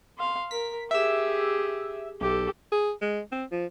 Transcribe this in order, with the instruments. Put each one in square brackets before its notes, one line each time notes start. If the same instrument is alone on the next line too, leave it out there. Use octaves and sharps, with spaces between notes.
[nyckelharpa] F5 C6
[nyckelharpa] A#4 [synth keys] B6
[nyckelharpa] G4 G#4 [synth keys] E5 E6
[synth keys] B1 [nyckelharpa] G4 A4
[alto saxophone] G#4
G#3
C4
F3